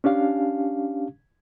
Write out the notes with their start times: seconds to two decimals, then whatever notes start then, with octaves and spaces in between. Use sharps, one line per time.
0.04 C#4 D4 G4 F5